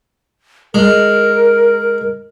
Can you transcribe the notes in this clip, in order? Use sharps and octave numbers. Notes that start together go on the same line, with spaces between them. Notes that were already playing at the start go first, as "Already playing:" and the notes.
G#3 A#4